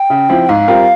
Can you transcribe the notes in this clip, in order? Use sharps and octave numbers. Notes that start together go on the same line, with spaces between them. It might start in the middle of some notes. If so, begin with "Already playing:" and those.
Already playing: G5
C#3
F3 C4 E4
G#2 F5
G3 C4 F4 A#4